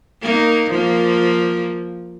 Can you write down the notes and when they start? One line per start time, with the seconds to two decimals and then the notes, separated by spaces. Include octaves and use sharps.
0.22 A#3 D#4
0.71 F3 A#3